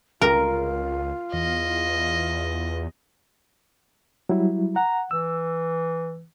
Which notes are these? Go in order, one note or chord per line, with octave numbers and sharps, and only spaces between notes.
C#2 F4 A#4
E2 D#5
F#3 G3 E4
F#5 A#5
E3 E6